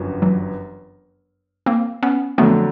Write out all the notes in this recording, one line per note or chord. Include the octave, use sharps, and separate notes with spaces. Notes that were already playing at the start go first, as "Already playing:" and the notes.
Already playing: G1 F#2 F3
E3 F#3
A#3 C4
B3 C#4
F2 D3 F#3 A3 B3